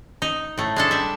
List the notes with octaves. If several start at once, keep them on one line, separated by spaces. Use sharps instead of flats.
D#4
A2 A3
G#3 D4 A4
G3 E5